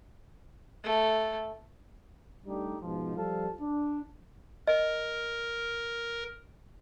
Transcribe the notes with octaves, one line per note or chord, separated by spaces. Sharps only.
A3
G3 A3 D4 D#4 G4
G#2 B2 F3
F3 G3 A4 F5 A5
D4
A#4 D#5